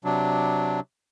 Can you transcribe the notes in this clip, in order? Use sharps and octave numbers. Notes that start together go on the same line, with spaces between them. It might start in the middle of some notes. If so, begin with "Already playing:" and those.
C3 F#3 D4